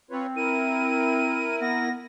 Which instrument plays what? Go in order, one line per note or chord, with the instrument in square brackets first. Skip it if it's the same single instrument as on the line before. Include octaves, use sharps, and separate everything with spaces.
[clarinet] C4 [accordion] F4 B4 C#5
[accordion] E4 A#4 [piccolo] D#7
[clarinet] B3 [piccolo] A#6